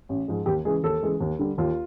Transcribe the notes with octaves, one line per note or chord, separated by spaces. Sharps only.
A1
G#2 F3 G#3
D#2 G4
C#3 E3 G#3 G#4
D#2 A4
C#3 E3 G#3
D#2
D3 G3
D#2 F4